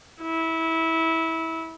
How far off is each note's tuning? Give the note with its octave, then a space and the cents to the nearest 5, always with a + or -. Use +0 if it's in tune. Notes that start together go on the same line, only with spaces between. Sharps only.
E4 -20